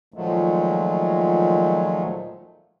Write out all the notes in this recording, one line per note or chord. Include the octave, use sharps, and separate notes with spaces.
A#2 D#3 F3 F#3 G#3 A3